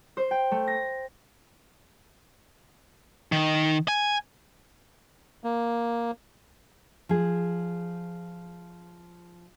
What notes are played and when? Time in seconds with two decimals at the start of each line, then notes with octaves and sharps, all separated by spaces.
0.17 C5
0.31 G5
0.51 A3
0.67 A#6
3.32 D#3
3.88 G#5
5.44 A#3
7.09 F3 G#4